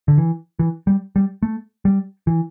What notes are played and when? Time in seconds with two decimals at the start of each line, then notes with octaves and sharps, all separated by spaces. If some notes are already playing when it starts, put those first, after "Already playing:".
0.08 D3
0.18 E3
0.59 E3
0.87 G3
1.16 G3
1.43 A3
1.85 G3
2.27 E3